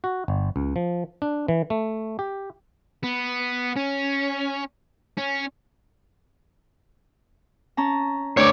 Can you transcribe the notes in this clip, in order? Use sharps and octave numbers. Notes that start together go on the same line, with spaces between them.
F#4
G1
C#2
F3
D4
E3
A3
G4
B3
C#4
C#4
C#4 A5 A#5
D2 D4 C#5 D5